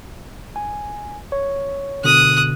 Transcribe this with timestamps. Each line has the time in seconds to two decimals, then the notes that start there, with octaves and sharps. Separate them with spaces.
0.56 G#5
1.32 C#5
2.04 B2 D3 D#6 F#6